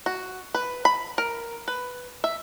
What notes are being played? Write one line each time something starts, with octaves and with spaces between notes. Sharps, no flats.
F#4
B4
B5
A#4
B4
E5